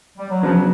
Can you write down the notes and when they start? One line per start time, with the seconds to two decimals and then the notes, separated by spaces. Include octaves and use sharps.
0.18 G3
0.30 F#3
0.43 C#3 F3 F#3 B3 D4